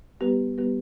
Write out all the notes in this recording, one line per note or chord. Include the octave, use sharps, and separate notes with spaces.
G3 B3 G4 B4
G3 B3 G4 B4